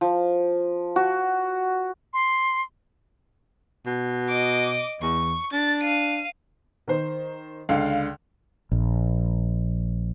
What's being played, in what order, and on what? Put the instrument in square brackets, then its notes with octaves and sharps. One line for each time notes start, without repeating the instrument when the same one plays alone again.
[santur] F3
F#4
[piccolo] C6
[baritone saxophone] B2
[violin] D#5 D6
[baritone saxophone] E2 [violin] C#6
[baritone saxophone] D4 [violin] A6
[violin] F5 D#7
[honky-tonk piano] D#3 C5
[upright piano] C#2 D3 [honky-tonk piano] F5
[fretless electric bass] A#1